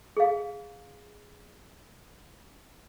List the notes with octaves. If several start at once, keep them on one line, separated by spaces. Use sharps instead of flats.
G#4 F5